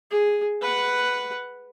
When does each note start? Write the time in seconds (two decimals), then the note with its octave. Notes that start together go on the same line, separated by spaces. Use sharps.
0.11 G#4
0.61 B4 F#5